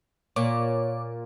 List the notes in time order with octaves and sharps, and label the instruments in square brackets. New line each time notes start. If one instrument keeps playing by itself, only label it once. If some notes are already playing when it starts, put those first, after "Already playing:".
[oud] A#2 [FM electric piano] C#5 D6